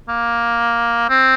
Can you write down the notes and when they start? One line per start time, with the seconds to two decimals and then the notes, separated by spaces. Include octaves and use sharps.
0.09 A#3
1.09 C4